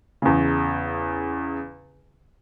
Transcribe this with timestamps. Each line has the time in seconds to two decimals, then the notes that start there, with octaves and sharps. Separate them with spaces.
0.22 E2 C#3